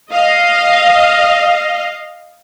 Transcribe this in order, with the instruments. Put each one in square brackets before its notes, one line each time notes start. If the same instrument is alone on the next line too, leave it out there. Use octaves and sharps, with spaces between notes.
[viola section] D#5 F5